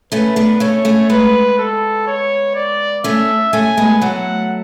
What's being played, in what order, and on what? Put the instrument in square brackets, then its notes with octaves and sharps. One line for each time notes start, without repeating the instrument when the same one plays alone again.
[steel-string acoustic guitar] A3 C#4 [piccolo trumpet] B4
[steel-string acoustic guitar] B3 D4
[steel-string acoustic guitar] A3 C#4 [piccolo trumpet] C#5
[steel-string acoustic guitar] A3 C#4
[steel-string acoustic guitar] G#3 B3 [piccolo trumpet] B4
[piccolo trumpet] A4
C#5
D5
[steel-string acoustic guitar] A3 C#4 [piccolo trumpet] E5
[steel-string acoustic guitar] A3 C#4 [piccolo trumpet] G#5
[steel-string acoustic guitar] G#3 B3
[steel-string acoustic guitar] F#3 A3 [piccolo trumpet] F#5